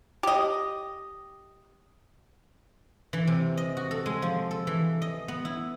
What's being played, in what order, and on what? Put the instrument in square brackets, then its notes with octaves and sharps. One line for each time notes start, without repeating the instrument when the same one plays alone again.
[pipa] G4 D#5
[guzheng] E3
C3
D#5
F#4
A4
G#3
F3
A4
E3
D#5
B3
E4